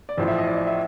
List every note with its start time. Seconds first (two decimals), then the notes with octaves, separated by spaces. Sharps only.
0.09 D5
0.17 A1 A2 F3 C5
0.28 E5
0.38 D#5
0.47 D5
0.57 E5
0.67 E5